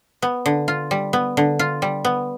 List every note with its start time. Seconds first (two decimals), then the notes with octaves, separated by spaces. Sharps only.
0.22 B3
0.46 D3
0.68 F4
0.91 G3
1.13 B3
1.37 D3
1.59 F4
1.82 G3
2.05 B3